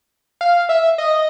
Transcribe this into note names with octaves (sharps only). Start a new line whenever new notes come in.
F5
E5
D#5